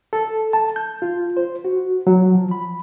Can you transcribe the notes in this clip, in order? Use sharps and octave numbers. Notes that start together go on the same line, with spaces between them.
A4
A5
G6
F4
C5
F#4
F#3
F3
B5